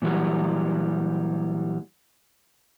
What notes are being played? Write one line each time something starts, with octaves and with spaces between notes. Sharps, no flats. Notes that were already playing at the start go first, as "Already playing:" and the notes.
A#2 E3 F#3 G3